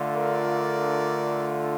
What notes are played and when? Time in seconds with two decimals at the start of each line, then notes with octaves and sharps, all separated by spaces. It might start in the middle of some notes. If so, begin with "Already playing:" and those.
Already playing: D3 A3 D4 F4
0.14 A#4 D5